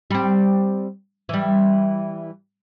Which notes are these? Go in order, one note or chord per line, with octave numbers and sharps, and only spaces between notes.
G3 C4
E3 G3